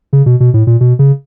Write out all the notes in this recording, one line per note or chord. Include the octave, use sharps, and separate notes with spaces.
C#3
B2
B2
A2
A#2
B2
C#3